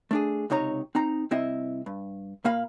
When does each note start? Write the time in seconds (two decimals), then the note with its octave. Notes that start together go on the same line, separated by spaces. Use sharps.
0.11 A3 D4 G#4
0.50 C#2 C3 D#4 C#5 A#5
0.95 C4 D#4 A#5
1.31 C2 C4 E4 D#5 E5
1.86 G2
2.45 A#2 A#3 F5 B5